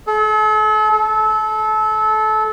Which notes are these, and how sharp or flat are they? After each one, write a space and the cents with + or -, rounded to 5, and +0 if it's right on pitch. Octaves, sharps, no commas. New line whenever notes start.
A4 -40
A4 -25